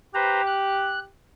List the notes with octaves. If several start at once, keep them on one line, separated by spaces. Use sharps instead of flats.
G4 B4 C5 A#5
F#6